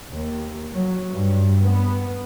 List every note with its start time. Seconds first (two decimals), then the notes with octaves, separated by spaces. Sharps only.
0.11 D#2
0.73 F#3
1.13 G2
1.65 B3